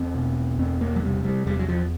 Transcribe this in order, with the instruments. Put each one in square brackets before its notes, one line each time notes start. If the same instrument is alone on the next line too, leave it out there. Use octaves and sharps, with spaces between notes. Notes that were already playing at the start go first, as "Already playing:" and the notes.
Already playing: [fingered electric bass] E2 C4
B2
E2 C4
A#3
F#3
C3 G3
G3
E2 G3
F#3
F3